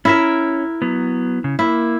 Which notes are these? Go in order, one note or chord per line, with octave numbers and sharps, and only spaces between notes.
C#4 E4 A#4 E5
F#3 B3
C#3
A#3 E4